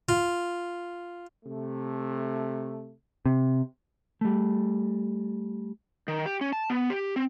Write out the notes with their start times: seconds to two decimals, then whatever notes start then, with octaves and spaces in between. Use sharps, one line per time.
0.09 F4
1.44 C3 A3
3.26 C3
4.21 G3 A3
6.08 D#3
6.26 G4
6.41 C#4
6.53 A5
6.70 B3
6.90 G4
7.16 C4